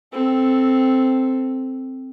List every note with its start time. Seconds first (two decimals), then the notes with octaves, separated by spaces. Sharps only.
0.13 C4 A4